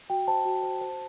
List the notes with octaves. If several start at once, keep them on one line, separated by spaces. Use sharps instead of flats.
F#4 G5
C5 A5
F#4
C5
C5